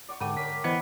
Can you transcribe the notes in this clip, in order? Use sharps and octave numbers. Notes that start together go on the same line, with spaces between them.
D5 F#5 C#6
G#2 D3 A3 D4 G4 F#5 D6
A#4 C#5 D5 B6
E3 B3 C5 D#5 B5